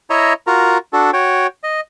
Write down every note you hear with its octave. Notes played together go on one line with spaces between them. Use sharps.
E4 C#5 D#5 E5 A#5
F4 F#4 A#4 A#5
D4 F#4 A4
F#4 C#5 G5
D#5